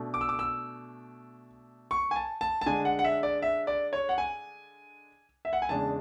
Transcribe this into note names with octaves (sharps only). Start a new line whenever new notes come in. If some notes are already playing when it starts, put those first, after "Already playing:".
Already playing: B2 A3 D4
D6
E6
D6
E6
C#6
G#5
A5
A5
A5
D3 G#3 D4 G#5
F#5
F#5
E5
D5
E5
D5
C#5
F#5
G#5
E5
F#5
G#5
E2 C#3 G#3 D4 A5